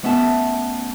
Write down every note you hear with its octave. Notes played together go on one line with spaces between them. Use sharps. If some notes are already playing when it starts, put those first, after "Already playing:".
A3 B3 C#4 E5 F#5 A5